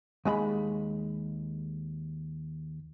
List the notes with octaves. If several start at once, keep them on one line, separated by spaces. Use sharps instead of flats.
D#2 G#3 A#5 B5